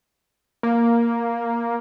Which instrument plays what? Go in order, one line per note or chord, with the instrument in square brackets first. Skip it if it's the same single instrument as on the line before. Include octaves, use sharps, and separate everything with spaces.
[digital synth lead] A#3